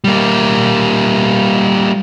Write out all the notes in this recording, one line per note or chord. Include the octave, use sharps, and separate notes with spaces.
G3 A#3